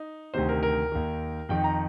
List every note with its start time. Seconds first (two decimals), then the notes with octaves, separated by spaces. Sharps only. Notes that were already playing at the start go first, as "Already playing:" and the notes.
Already playing: D#4
0.34 D2 C3 D#3 C5
0.49 A#4
0.63 A#4
0.92 D#2 D#3
1.49 F2 D#3 G5
1.64 A#5